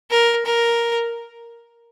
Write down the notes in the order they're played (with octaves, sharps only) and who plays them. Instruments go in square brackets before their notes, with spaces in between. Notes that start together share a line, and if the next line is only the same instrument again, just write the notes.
[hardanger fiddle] A#4
A#4